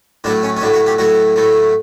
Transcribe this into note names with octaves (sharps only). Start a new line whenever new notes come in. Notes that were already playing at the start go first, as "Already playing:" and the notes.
A2 F#3 A3 D4
C#4
C#4
A2 F#3 A3 D4
F#4
G4
A2 F#3 A3 F#4
A2 F#3 A3